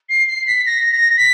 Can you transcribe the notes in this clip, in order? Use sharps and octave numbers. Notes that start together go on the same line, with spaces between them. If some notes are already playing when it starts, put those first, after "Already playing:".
C7
C7
B6
A#6
A#6
B6